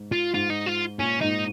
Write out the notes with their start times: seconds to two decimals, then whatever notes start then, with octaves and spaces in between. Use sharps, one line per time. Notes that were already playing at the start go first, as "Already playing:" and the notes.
Already playing: G#2
0.12 F4
0.34 G#2 F4
0.50 D#4
0.66 F4
0.99 A#2 C#4
1.21 G#2 D#4